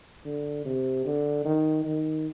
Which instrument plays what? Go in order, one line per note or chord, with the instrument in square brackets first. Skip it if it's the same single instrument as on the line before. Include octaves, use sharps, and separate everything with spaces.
[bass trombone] D3
C3
D3
D#3
D#3